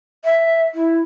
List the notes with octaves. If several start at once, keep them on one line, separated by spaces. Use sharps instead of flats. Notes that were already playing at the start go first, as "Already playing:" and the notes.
E5
E4